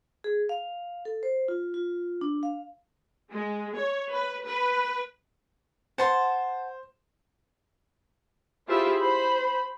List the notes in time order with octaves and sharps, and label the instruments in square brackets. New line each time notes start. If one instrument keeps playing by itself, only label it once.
[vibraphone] G#4
F5
A4
C5
F4
F4
D4
F5
[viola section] G#3
C#5
B4
B4
[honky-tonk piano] C5 [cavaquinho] F#5 A5 C6
[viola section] E4 F4 G4 G#4 C5 E5
C5 B5